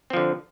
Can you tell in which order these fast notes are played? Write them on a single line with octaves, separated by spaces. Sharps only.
C4 F3 D3